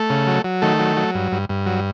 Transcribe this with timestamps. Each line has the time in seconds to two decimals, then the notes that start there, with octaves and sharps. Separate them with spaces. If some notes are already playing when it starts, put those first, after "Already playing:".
Already playing: A3 A4
0.10 C#3
0.27 F#3
0.44 F#3
0.62 D#3 A3 A4
0.80 F#3
0.97 F#3
1.14 G2
1.32 G2
1.49 G2
1.66 F#3